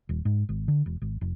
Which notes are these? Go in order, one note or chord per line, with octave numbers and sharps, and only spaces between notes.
D#1
G#2
G#1
D3
E1
G#1
F1